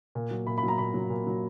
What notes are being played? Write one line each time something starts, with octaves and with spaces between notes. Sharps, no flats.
A#2
F#3
A#2 B5
B5
F#3 A#5
A#2 B5
F#3
A#2
F#3